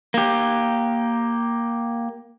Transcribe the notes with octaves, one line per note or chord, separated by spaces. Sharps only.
A#3 G4